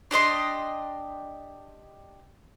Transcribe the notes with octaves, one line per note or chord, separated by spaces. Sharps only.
D4 G4 D#5 C6